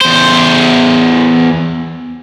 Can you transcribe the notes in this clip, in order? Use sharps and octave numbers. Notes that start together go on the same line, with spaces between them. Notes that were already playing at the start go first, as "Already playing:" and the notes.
E2 C5